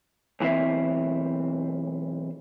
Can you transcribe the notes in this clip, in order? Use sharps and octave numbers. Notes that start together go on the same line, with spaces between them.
B1 E3 C4 E5